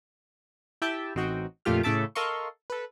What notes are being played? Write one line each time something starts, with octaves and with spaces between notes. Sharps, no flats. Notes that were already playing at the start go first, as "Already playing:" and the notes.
E4 G4 E5 G5 A5
A1 C4 D#4 F#4 G5
F2 A#2 A3 F4 G4 F6
A2 C#3 A4 E5 A5 D6
A4 A#4 D#5 F5 C6 C#6
A4 B4